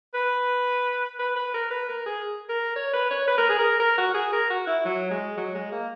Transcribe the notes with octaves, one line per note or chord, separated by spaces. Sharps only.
B4
B4
B4
A#4
B4
A#4
G#4
A#4
C#5
B4
C#5
B4
A#4
G#4
A#4
A#4
F#4
G#4
A#4
F#4
E4
F#3
G#3
F#3
G#3
A#3